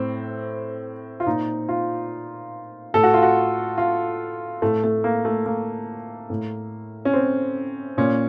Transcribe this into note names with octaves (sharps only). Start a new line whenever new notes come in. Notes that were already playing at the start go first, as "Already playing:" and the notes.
Already playing: A2 C4
F4
A#2 D#4
F4
A2 A4
F#4
F4
F#4
F4
A2 A3
A3
A#3
A3
A#3
A2
C#4
C4
A#2 C#4